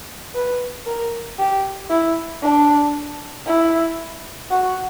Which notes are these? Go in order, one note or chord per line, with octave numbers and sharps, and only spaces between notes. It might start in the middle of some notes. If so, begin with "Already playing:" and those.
B4
A#4
G4
E4
D4
E4
F#4